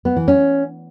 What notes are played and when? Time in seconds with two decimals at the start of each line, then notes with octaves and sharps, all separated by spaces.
0.05 B3
0.16 E3
0.28 C#4